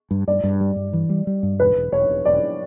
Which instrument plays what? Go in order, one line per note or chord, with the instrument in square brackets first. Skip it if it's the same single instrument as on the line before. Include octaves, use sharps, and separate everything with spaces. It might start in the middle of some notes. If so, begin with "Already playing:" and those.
[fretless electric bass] G2
[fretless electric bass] G2 [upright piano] D5
[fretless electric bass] G2
G3
G2
E3
G3
G3
G2
[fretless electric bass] E1 [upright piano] B4
[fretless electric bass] E1
[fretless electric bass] E1 [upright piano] C#5
[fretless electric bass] E1
[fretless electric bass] E1 [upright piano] D5